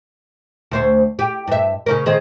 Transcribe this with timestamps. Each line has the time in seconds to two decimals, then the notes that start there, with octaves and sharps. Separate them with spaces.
0.71 D2 C5 C#5
1.19 G4
1.47 G2 E5
1.86 C#3 C#4 A#4
2.06 D#3 G#4 C5